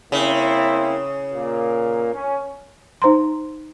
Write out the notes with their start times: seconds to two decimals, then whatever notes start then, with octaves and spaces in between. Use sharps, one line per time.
0.12 C#3 A#3 C4 E4
1.33 A#2 A#3
2.14 C#4
3.02 D#4 C5 A#5 C6